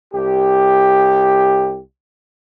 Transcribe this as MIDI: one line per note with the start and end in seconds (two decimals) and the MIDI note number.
0.12 1.79 36
0.12 1.79 67